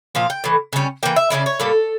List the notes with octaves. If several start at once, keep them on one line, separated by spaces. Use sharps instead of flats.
A#2 F3 F5
G5
A2 E3
C#3 G3 C#4
E3 A#3 G5
E5
C#3 F3 C#4 E4 D5
C#5
A2 G3 A#3 A4